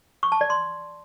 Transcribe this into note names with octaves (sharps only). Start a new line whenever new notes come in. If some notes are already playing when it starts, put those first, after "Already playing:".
C#6
A5
D5
C6